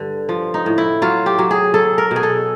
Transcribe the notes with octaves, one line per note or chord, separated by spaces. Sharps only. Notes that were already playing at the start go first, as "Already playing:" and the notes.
Already playing: G2 D3
F3
D#4
A2
E4
F#3 F4
G4
F#3
G#4
F#3 A4
A#4
B2
G#4
A4